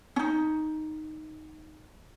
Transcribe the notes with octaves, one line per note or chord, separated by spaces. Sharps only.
C#4 D#4